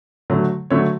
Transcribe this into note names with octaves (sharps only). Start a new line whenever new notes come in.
D3 F#3 A3
D3 F#3 A3 C#5